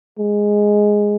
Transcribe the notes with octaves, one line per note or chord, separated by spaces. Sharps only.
G#3